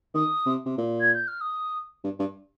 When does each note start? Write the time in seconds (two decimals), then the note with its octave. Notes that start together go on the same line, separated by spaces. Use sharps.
0.14 D#3 D#6
0.46 C3
0.65 C3
0.78 A#2
1.00 G#6
1.14 G6
1.28 F6
1.41 D#6
2.04 G2
2.19 G2